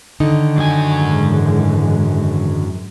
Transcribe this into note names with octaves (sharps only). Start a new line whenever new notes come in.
D3 D#3 D#4
F#2 G#5
G#2 E3 G#3